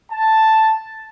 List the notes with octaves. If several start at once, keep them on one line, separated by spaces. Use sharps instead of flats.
A5